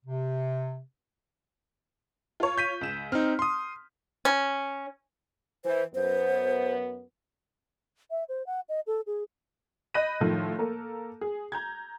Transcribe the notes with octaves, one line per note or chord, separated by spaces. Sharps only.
C3
F4 C#5
G6 B6 D#7
C#2 E7
C4 D#4 F6
C6 D#6
C#4
E3 C5
F#2 B3 C5
E5
C5
F#5
D#5
A4
G#4
D#5 B5 F#6 G6 A#6 D#7
A2 D#3 F3 A3
A#3 A4 A#4
G#4
A#5 G6 G#6